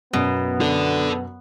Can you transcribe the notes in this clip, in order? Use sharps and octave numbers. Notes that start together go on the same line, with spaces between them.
F#2 B2 B3
A4 D5